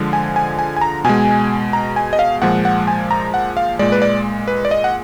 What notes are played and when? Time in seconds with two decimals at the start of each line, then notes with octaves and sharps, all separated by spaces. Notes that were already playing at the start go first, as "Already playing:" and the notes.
Already playing: D3 F3 G#3
0.13 G#5
0.36 G#5
0.59 G#5
0.77 G#5
0.81 A#5
1.04 B2 G#3 G#5
1.73 A#5
1.96 G#5
2.13 D#5
2.19 F5
2.42 A#2 F3 G#3 F#5
2.65 F#5
2.87 G#5
3.11 A#5
3.34 F#5
3.57 F5
3.79 A#2 G#3 D5
3.92 B4
4.02 D5
4.48 B4
4.65 D5
4.71 D#5
4.84 F#5